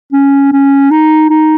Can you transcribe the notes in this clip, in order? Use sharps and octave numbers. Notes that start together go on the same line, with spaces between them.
C#4
C#4
D#4
D#4